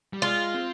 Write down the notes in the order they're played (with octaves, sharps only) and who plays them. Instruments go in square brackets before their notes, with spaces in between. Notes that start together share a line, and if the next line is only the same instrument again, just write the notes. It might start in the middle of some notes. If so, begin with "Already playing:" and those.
[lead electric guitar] G3
[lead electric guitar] G#3 [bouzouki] F4
[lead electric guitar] C4